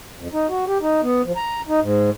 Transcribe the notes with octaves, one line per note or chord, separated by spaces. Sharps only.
F2
D#4
F#4
G4
D#4
B3
F3
A#5
D#4
G#2